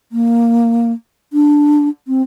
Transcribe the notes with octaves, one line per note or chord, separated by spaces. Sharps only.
A#3
D4
C4